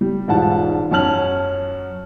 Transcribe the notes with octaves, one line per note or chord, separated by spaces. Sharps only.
G3
E1 G#2 F4 F#5 A5
F#2 C#4 A5 F6 F#7